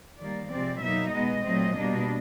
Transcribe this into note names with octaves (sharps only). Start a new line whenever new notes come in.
D#3 G3 A#3 D5
C3 F3 G#3 C4 D5
B2 F#3 A#3 D#4 E5
B2 G#3 B3 D#5
A#2 F#3 A3 C4
B2 G3 A#3 D4